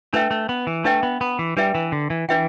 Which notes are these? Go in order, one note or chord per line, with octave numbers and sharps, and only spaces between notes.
A3 D4 B4 E5 G5
A3
B3
E3
A3 D4 B4 E5 G5
B3
B3
E3
G3 D4 B4 E5 G5
E3
D3
E3
E3 D4 B4 E5 G5